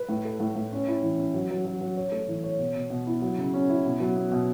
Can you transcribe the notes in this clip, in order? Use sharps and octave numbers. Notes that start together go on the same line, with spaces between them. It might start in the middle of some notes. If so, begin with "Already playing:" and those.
Already playing: B4
A2
A4
A2
A2
C#4
E4
E3
C#4
F#3
F#3
F#3
F#3
C#5
A3
E3
C#5
B2
B2
B2
E4
F#3
C#3
C#4
E4
B2
F#3
B3
B2